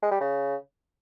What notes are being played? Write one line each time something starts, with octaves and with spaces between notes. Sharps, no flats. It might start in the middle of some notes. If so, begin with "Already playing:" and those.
G#3
G3
C#3